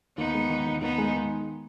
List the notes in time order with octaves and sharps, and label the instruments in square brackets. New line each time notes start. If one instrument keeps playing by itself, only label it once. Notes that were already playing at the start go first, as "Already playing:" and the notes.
[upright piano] D#2 [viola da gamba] B3 D#4
[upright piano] G#3
D#3
D#2
[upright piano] D#2 [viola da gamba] B3 D#4
[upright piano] G#3
D#3